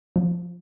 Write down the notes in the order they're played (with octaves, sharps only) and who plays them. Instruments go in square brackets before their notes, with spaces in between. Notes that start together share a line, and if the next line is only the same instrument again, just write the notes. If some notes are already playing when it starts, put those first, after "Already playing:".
[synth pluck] F3